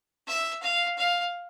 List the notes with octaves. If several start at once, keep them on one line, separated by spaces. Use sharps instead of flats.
E5
F5
F5